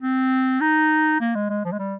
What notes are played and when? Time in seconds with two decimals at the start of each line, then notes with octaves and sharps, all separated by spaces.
0.03 C4
0.61 D#4
1.21 A#3
1.35 G#3
1.50 G#3
1.65 F3
1.72 G#3
1.79 G3